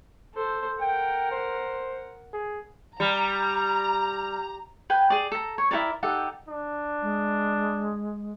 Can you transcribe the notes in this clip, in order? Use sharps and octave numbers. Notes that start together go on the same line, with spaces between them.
A4 C5
A#4 F#5 G5
C5
G#4
G3 A#5
B4 G5 G#5
G#4 D5
A4 A#5
C#5
E4 F#4 A#4 D5
D#4 G4 A4 F#5
D4
G#3